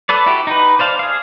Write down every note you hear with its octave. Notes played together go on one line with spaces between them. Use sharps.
A4 B4 D5
E4 F#4 G4
D#4 G4 B4
C5 D5 F5 A5
G#4 F5